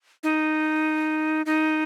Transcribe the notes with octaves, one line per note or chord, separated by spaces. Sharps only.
D#4
D#4